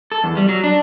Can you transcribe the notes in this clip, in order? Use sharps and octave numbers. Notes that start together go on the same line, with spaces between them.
A4
E2
G3
F#3
D4